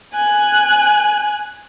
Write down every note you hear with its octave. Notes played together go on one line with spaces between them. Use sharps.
G#5 F#6